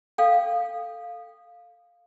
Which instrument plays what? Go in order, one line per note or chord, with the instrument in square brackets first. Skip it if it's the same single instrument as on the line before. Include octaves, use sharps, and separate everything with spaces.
[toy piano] A4 F5 G5